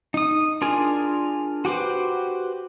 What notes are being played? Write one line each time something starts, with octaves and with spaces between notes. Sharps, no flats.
D#4 D#6
D4 F4 G#4 A#4 G#5
F#4 G4 B4 C5